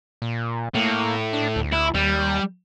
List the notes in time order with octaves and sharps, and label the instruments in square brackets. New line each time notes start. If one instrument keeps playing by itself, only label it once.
[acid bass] A#2
[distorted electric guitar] A2 [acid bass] A#3
[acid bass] D4
D2
[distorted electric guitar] E4
[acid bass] D#2 [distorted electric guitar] G3